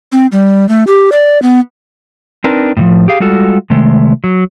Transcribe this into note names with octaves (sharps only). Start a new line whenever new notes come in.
C4
G3
A3
G4
D5
B3
C4 D4 D#4 A#4 B4
A2 C3 F3
G4 G#4 F5
G3 G#3 F4 F#4 A4
C3 D#3 G#3 A3
F#3